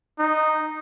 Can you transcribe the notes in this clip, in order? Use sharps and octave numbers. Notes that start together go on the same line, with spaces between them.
D#4